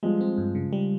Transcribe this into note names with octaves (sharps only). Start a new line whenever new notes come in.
F3 G3 G#3
C4
G2
C#3
G3